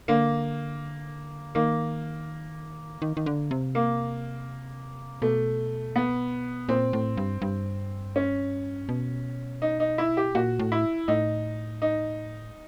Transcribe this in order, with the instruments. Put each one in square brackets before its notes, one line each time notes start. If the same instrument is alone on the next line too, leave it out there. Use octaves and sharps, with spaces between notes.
[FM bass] D3 [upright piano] A#3
[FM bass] D#3 [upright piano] A#3
[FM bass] D#3
D#3
D3
C3
[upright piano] A#3
[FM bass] B2 [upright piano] A3
[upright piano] B3
[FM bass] A#2 [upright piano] C4
[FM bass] A2
G2
G2
[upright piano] C#4
[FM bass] B2
[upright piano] D#4
D#4
E4
G4
[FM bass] A#2 [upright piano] F#4
[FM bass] A2
[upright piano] E4
[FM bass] A2 [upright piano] D#4
[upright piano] D#4